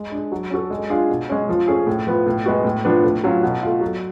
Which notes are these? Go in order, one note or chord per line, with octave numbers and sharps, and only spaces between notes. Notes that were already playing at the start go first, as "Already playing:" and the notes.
Already playing: G#3
D4 G#4
F#3
C#4 F#4 A4
G#3
D4 F4 G#4
B2
G#3 C#4
F3
A3 C#4 G#4
A2
F3 B3
A2
G#3 B3 F#4
A2
F3 B3 D4
A2
F#3 C#4 F4
B2
A3 F4
F#3